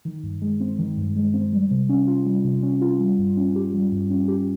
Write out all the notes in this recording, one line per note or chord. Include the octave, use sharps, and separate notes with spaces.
D#3
G2
G#3
C4
D#3
G2
G#3
C4
G3
C3
C#4
F4
G3
C3
C#4
F4
G3
G2
C#4
G4
G3
G2
C#4
G4